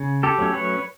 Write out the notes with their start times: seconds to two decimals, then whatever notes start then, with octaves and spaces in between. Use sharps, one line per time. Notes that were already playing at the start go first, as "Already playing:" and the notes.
Already playing: C#3
0.23 G4 A4
0.38 F#3 A3 C#4
0.54 B4 C#5